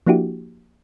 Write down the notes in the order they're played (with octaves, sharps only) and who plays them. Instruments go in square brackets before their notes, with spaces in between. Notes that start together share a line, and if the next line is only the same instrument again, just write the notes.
[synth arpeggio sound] F3 A#3 D4 E4 F#4 G4